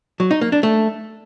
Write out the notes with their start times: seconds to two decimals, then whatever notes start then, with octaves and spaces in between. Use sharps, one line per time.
0.20 F#3
0.31 D#4
0.41 A#3
0.52 D4
0.63 A3